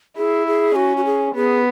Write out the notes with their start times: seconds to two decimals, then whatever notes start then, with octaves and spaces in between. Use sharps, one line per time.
0.17 E4 G#4
0.47 G#4
0.75 C#4 F#4
0.97 F#4
1.05 G#4
1.35 B3 G#4